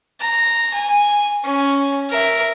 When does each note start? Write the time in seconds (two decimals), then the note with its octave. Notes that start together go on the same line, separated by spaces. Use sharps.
0.21 A#5
0.74 G#5
1.44 C#4
2.10 A#4 E5